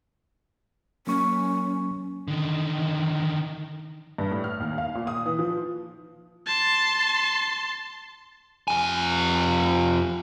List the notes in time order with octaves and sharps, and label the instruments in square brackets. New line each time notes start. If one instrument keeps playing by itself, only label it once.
[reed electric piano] F#3 A#3 C#6 [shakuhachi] C#4
[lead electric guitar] D3 D#3
[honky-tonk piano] G2
A2
F6
D#2
F5
A#2
D#6
E3
F3
[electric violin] A5 C6
[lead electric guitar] F2 G#5